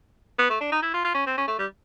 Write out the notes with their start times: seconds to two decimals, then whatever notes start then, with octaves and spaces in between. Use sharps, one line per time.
0.39 B3
0.50 A3
0.61 D4
0.72 D#4
0.82 E4
0.94 F4
1.04 F4
1.15 C#4
1.27 C4
1.38 C#4
1.48 A3
1.58 G3